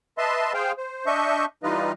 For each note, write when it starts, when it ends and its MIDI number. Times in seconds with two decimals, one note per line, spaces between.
0.18 0.53 71
0.18 0.53 75
0.18 0.53 76
0.18 0.53 81
0.18 0.53 84
0.54 0.72 68
0.54 0.72 72
0.54 0.72 77
0.54 0.72 79
0.78 1.06 72
1.06 1.45 62
1.06 1.45 75
1.06 1.45 76
1.06 1.45 85
1.06 1.45 91
1.63 1.92 52
1.63 1.92 55
1.63 1.92 63
1.63 1.92 65
1.63 1.92 71
1.63 1.92 75